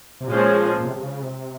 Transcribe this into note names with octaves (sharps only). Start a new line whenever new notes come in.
C3
A#2 F3 G#3 C#4 G#4 C5
A#2
C3
C3
C#3
C3